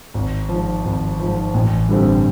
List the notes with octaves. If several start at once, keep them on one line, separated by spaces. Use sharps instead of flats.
G#1
F3
G#2
G#1
G#2 F3
A1
G2 D3 G3 C4